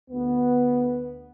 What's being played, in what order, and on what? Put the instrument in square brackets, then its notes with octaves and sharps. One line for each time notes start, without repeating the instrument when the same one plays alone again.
[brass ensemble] D2 B3